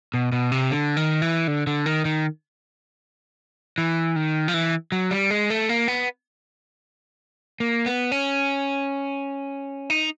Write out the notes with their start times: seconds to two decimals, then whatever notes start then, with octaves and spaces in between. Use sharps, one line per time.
0.14 B2
0.32 B2
0.52 C3
0.71 D3
0.97 D#3
1.22 E3
1.48 D3
1.67 D3
1.86 D#3
2.05 D#3
3.78 E3
4.16 D#3
4.48 F3
4.54 E3
4.92 F#3
5.11 G3
5.30 G#3
5.50 A3
5.69 A#3
5.88 B3
7.60 A#3
7.86 B3
8.12 C#4
9.90 D#4